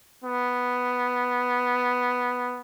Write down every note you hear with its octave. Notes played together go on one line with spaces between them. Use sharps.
B3